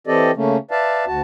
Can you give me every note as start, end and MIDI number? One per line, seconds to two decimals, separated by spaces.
0.07 0.31 52
0.07 0.31 60
0.07 0.31 67
0.07 0.31 69
0.07 0.31 74
0.07 0.31 75
0.36 0.57 49
0.36 0.57 57
0.36 0.57 58
0.36 0.57 61
0.71 1.05 71
0.71 1.05 74
0.71 1.05 76
0.71 1.05 77
0.71 1.05 81
1.06 1.22 38
1.06 1.22 66
1.06 1.22 81